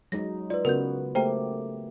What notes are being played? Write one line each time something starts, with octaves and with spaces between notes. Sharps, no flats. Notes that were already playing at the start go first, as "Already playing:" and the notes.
F#3 G#3 D#4 A#6
F4 B4 D5
C#3 B3 F#4 A#4 G6
A3 A#3 G4 C5 G5 A#5